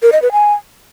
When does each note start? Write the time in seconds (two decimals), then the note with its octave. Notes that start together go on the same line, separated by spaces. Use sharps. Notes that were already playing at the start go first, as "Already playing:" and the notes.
0.03 A#4
0.12 D#5
0.22 B4
0.32 G#5